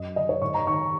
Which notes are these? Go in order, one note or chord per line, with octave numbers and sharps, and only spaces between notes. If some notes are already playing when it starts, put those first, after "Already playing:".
Already playing: F#2 D#5
C#3 D#5
C#5
G#2 C#6
A#5
D#3 C#6